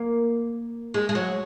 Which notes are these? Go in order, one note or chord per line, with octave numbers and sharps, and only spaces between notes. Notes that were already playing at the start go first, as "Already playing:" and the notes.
Already playing: A#3
G#3
G#3
F#3